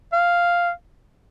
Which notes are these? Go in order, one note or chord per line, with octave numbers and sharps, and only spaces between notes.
F5